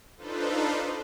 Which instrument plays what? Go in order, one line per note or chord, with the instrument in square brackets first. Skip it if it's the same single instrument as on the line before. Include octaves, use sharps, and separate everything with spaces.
[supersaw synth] D4 D#4 F4 A4 B4 C5